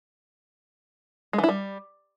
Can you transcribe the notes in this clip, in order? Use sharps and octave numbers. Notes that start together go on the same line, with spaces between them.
G#3
E3
E4
G3